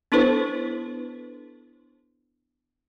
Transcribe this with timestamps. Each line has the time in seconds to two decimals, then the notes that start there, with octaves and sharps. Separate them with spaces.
0.12 B3 D4 E4 A4 B4 C5